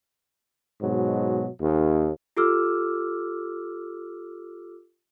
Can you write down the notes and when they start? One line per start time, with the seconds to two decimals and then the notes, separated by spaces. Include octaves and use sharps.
0.81 G#2 B2 F#3
1.61 D#2
2.37 F4 G4 A4 D6 E6 F6